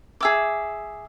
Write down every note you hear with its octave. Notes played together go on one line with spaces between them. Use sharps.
G#4 E5 D6